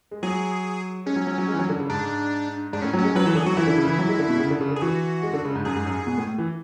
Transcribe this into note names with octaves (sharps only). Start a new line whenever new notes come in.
G#3
F#3 G#4
G#3 C#4
F#3
F#3
F#3
G#3
E3
F#3
D3
C#3
G#2 D4
G#2 D4
A2 C#4
F#3
C#4
G#3
F#3 B4
E3 A4
D3 G#4
F#3 F#4
E3 E4
D3
C#3
E3
F#3
G#3
D3
B2
C#3
D3
C#3
D3
G#4
E3 F#4
G#3
D3
C#3
G#2
F#2 G#4
G#2
F#2
G#2
B2
A2
E3